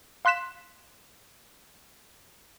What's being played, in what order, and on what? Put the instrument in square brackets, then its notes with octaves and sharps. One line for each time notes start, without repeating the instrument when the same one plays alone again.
[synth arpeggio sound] F5 C6 F#6 B6 E7